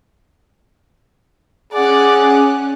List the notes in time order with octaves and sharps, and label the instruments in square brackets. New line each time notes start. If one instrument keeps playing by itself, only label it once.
[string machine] C#4 F#6 [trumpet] G#4 [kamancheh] D5 F#5